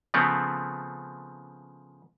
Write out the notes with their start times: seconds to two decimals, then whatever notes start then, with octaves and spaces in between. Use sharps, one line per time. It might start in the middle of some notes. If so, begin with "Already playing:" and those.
0.14 C#3 F3 A3 B3 C4